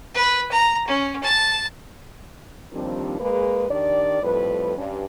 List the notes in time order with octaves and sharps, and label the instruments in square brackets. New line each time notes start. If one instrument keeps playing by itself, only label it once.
[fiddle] B4
A#5
C#4
A5
[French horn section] D#2 D#3 F3 G3 C4 D4
G#3 A#3 G#4 B4
D#3 D4 G4 D5
F2 A2 G3 B4
G2 C#4